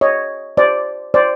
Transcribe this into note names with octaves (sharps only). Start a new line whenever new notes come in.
C#5 D#5
C5 D5
C5 D5